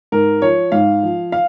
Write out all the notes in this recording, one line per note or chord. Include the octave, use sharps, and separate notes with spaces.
G#2 A#4
F3 C#5
G#2 F5
F3
F5